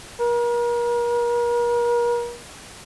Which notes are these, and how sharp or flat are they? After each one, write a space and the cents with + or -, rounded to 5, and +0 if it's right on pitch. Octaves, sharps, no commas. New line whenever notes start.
A#4 +40